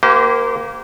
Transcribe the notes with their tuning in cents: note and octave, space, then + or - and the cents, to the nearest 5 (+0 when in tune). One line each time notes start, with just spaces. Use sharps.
A#3 +0 G4 -35 C5 -35